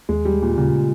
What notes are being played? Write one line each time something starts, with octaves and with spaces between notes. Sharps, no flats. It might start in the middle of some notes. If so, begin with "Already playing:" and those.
D#2 G#3
G3
G#3
A#2
A#2 C#3